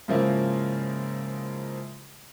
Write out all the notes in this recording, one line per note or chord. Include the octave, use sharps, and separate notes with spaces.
G#2 C#3 F3 A#3 E4